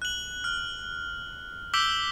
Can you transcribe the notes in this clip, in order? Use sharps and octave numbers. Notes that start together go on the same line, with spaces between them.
F#6 F#7
F6
D6 E6 G6 B6 D7 G7